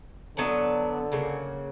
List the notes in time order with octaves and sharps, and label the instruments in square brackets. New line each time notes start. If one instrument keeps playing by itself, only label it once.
[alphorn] D3 [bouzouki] F#3 B3 D4
[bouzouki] C#3 F#3 A#3